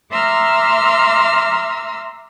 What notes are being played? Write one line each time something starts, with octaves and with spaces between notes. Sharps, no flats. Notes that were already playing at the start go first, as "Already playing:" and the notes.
E5 A#5 C6 D6 E6 F6